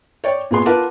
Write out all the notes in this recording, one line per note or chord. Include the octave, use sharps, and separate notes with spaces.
C#5 D5 G5
A#2 B3 G#4 C6
F4 A#4 B4 F#5 A5 D6